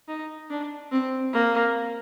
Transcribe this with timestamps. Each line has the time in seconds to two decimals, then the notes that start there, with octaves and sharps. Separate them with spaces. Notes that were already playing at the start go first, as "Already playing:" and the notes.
0.08 D#4
0.50 D4
0.91 C4
1.33 A#3